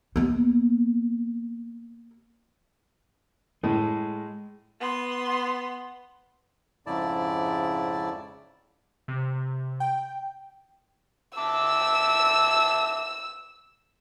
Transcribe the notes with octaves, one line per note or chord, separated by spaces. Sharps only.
A#3 B3
A2 G#3
B3 C6
F2 G#2 C#3 E4 D5 A5
C3
G5
E5 A5 D6 E6